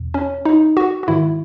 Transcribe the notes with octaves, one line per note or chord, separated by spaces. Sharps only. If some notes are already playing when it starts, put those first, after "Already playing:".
Already playing: E2 B2
C#4
D#4
F#4
F#4
G#2 D#3 E4